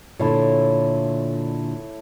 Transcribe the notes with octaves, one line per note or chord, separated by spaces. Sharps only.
A#2 D3 A3 E4 C#5